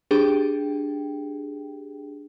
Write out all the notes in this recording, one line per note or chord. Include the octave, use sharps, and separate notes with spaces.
D4 G4 G#4 G5